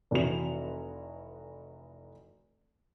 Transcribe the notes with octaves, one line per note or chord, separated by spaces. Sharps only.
F1 E3 F#4 F7